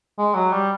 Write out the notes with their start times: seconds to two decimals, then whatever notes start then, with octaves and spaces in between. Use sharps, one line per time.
0.18 G#3
0.34 F#3
0.52 G3